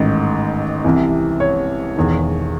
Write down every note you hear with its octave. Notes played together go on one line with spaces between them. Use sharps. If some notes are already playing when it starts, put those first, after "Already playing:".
Already playing: A1 G#2 D#3
C2 C3 E3
C#5
E1 E2 D#3